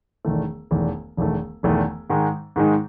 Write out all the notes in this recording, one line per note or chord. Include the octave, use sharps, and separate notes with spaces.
E1 E2 D#3 A3
E1 E2 D#3 A3
E1 E2 D#3 A3
E1 E2 D#3 A3
G#2 D#3 G#3 D#4
G#2 D#3 G#3 D#4